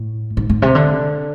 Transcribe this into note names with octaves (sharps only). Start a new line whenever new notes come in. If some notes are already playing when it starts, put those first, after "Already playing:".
Already playing: A2
G#2
G#2
C3
D3